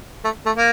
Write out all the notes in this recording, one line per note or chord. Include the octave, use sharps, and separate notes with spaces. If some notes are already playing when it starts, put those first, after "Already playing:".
A3
A3
A#3